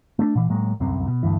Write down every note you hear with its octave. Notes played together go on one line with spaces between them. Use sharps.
A3 B3 D4
A#2 E3
A2 F#3 G#3 A#3
D1 C2 F#2 C4
B2
G1 D2 G2 E3